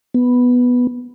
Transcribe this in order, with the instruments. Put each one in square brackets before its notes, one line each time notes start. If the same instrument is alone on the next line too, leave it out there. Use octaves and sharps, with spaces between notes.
[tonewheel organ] B3